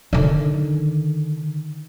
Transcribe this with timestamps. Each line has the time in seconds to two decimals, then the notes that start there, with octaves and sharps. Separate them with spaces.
0.13 D3 D#3